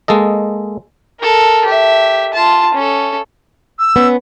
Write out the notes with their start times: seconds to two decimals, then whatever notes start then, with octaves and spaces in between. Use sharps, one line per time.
0.08 G#3 A#3 A4 D#5
1.20 A4 A#4
1.65 G4 E5
2.33 F4 A5
2.74 C#4 A4
3.79 E6
3.96 B3 C#4